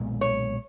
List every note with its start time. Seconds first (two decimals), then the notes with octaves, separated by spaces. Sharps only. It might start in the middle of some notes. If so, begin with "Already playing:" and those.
Already playing: B1 A#2 G#3 B3
0.21 C#5